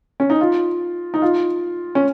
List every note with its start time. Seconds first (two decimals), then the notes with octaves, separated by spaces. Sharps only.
0.20 C#4
0.30 D#4
0.41 F4
1.14 D#4
1.22 F4
1.95 C#4